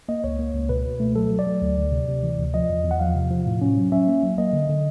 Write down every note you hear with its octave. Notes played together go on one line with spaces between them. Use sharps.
A#3 D#5
C#2 C#5
A#3
C#2
B2 B4
B2
A3
F#3 A4
F#3
D5
F#3
D2
D2
C3
C3
E3
D2
F3 D#5
E2
E2
F#5
F3 F5
C3
F3
A2
C#4
F#3
C#4 E5
A#3
F#3
A#3 D#5
D3
D3